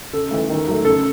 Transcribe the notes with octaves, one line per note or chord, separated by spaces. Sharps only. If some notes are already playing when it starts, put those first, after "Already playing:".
C#3 A4
E3 A3
D#3
F#3 A3
C#3 A4